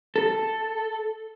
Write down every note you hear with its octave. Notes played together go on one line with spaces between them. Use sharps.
A4